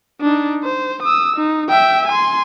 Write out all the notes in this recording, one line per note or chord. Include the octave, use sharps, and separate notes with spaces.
D4 D#4
C5
D#6 E6
D#4
E5 G5
G#5 C6